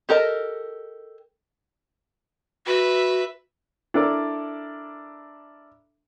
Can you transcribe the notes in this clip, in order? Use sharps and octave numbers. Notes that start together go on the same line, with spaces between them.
G4 A4 A#4 D#5
F#4 B4 E5
D4 E4 A4 A#4 D5